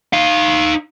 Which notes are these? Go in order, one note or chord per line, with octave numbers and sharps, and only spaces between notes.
D#4 F5